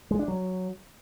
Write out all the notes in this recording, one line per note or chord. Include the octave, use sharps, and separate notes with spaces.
G#3
D4
F#3